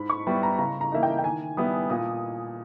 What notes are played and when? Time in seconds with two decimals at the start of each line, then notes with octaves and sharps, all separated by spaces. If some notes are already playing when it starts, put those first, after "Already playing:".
Already playing: G#2 B5
0.10 C#6
0.27 G3 B3 E4
0.43 A#5
0.59 C#3 A#5
0.81 A#5
0.92 E3 A#3 D#4 E5
1.03 G5
1.19 G5
1.24 D#3 G#5
1.57 G3 B3 E4 D#6
1.90 A#2 D#6